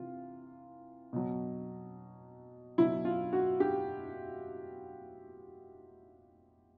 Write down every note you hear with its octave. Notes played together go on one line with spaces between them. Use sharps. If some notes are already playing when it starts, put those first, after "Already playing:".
Already playing: C3 E3 F4
B2 F#3
B2 F#3 E4
F4
F#4
G4